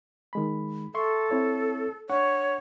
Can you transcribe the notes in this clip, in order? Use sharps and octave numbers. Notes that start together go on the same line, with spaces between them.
D#3 G#3 B5
A4 E5 C6 C#6
C4 E4 C#5
D4 C#5 F#5 C#6